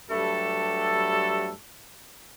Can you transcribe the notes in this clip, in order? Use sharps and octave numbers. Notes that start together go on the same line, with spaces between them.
G2 F#3 G3 A3 A4